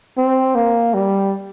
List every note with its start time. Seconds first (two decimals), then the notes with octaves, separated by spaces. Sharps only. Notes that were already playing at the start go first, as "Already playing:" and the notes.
0.17 C4
0.55 A#3
0.94 G3